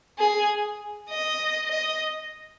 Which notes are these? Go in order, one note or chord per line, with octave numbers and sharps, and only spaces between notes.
G#4
D#5
D#5